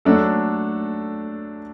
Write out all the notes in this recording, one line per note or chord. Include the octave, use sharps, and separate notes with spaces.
F#3 A3 D4 A4